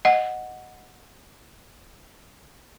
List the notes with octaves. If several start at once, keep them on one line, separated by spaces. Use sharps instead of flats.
D#5 F#5